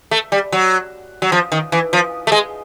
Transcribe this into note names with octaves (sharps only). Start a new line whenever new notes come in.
A3
G3
F#3
F#3
F3
D#3
E3
F3
A3
G#3